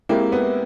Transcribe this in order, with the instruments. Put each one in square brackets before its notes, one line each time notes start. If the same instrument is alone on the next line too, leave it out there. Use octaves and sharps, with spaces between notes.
[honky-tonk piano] G#3 C4 E4 G4 [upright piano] A#3
[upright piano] B3